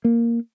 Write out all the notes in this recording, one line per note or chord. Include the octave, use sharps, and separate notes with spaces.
A#3